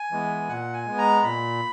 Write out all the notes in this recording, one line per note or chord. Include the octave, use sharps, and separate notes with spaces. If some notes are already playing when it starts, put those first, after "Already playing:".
Already playing: G#5
E3 G#3 B3
A#2 F#5
G#5
G#3 B3
A#5
A#2 B5